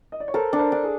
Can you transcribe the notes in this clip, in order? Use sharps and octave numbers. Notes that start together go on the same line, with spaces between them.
D#5
D5
C#5
A4 A#4 C5
D4
A#4 C5
D4
G#4